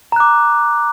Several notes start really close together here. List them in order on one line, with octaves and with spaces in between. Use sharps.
A#5 F#6 D6